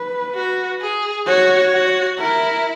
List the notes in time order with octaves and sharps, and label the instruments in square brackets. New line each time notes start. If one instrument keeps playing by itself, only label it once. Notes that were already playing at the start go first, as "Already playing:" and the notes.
Already playing: [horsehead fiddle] B4
[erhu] F#4
G#4
[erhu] F#4 [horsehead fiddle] C#5
[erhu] F#4
[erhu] E4 [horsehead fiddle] A#4